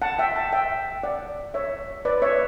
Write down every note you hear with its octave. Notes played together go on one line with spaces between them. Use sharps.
F#5 A5
E5 G5
F#5 A5
E5 G5
D5 F#5
C#5 E5
B4 D5
C#5 E5